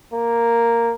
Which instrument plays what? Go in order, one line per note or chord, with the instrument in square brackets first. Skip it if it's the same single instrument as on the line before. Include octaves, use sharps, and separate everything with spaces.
[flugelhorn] A#3